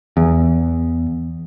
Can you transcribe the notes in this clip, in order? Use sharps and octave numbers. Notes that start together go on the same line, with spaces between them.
E2